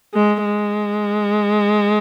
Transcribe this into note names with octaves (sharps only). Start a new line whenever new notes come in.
G#3
G#3